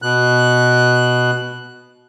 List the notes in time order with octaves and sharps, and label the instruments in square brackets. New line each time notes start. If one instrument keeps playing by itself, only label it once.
[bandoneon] B2 F#6